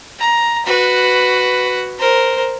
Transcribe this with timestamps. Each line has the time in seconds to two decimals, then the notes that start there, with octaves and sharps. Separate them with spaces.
0.19 A#5
0.66 F#4 B4
1.99 A#4 C5